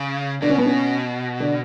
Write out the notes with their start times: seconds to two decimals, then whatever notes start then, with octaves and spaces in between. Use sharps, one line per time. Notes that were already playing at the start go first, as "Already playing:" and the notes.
Already playing: C#3
0.42 B2 D3 D4
0.50 C#4
0.58 B3
0.66 C#4
1.40 D3 D4